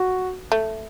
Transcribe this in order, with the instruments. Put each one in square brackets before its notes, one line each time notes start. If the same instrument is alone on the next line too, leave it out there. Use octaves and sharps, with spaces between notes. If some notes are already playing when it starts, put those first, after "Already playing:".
Already playing: [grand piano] F#4
[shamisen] A3